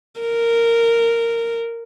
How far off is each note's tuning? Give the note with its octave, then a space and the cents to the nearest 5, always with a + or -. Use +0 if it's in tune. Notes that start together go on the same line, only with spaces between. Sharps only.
A#4 -10